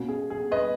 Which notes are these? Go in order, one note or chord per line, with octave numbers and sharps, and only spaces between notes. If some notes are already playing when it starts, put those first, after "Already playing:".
Already playing: B2 A#3 C#4 F#4
G#4
G#4
B4 D#5